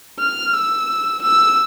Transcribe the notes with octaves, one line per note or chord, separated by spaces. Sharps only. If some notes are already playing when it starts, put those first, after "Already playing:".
F6
E6
E6